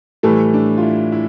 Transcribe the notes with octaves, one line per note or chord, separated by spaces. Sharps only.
A2 E3 G3 A3 A4
D4
F4
E4
E4